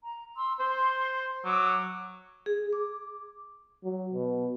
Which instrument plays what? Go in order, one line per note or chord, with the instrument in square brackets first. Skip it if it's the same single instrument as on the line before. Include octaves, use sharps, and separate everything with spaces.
[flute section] A#5
C6 E6
[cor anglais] C5 [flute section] C6
[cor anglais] F#3 [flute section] D6 E6
[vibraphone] G#4
D6
[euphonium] F#3
B2